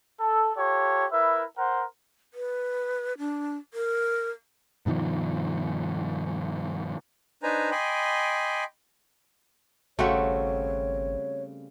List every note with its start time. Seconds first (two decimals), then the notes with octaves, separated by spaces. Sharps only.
0.20 A4
0.57 F4 G4 A4 C#5
1.12 E4 A#4 B4 E5
1.57 A#4 C5 F#5
2.34 B4
3.18 D4
3.74 A#4
4.86 G2 B2 D#3 F3
7.43 D4 D#4 B4 C5 G#5 A#5
7.71 D#5 G5 G#5 B5 C6 D6
9.99 G#1 C#3 G3 A3 C4 F#4 C#5